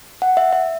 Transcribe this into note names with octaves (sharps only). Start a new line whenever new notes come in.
F#5
E5
E5